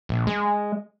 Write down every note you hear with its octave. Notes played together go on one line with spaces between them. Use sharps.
A#1
G#3